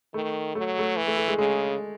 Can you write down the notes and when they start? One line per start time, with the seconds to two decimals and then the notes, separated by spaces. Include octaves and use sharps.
0.14 D#3 A3
0.55 F#3 A3
0.79 A3
0.97 E3
1.07 A3
1.17 A3
1.28 G#3
1.38 C#3 G#3